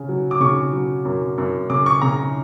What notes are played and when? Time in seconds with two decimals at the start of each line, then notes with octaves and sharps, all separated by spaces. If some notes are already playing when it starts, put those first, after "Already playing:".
Already playing: C#3
0.09 F#3
0.31 D6
0.40 C#3 C#6
0.73 F#3
1.05 F#2
1.38 F#2
1.70 C#3 D6
1.86 C#6
2.02 C#3 A#5